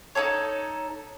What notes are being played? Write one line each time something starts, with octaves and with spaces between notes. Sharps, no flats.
D#4 G4 A4 C#5